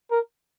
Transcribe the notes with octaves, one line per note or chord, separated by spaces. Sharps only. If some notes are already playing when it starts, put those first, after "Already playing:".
A#4